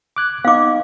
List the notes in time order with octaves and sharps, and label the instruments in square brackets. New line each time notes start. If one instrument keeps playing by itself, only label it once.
[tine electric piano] D6 F#6 G#6
[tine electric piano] B3 D#4 [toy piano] F5 D6